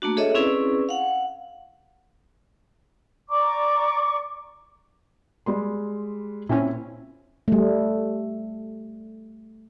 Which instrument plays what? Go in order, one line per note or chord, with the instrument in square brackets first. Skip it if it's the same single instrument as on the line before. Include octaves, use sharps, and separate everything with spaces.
[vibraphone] A3 A#3 D4 F#4
G#4 A4 C#5 D#5 E5
C4 C#4 E4 G#4 B4 D5
F5 F#5
[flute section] D5 A#5 C#6 D6
[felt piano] G3 G#3 C6
[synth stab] A#2 C4 C#4 [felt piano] E4
[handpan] G3 A3